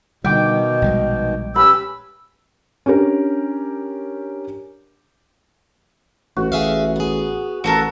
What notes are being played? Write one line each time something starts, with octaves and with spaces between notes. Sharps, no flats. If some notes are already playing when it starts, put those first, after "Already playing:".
B2 D3 D#3 G3 G5 D6
A#1 G3 G#3
C#4 G4 B4 B5 E6
C#4 D4 G4 A#4
A1 F#4
G#4 E5 F5
B3 G#4
A1 F#4 A4 A#4